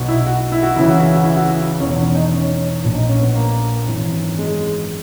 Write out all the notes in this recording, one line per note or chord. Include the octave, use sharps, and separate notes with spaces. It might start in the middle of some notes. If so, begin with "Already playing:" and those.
Already playing: B1 B2
E4
F#4
E4
F#4
C#2 C#3 E3 E4
F#4
E4
F#4
E4
F#4
E4
E1 E2 D#3 C#4
C#4
D#4
C#4
A#1 A#2
D#4
C#4
B3
A#3
G#1 F#2 E3
G#3